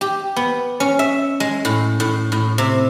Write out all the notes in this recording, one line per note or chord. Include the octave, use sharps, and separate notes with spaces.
G4
B3
C#4
E5
G#3
A2
A2
A2
C3